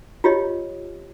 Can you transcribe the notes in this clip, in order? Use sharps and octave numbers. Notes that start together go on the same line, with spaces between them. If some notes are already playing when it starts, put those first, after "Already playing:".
F4 G4 C#5 D#5